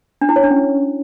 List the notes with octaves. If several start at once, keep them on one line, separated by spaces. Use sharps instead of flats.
D4
E4
C#5
D4
C#4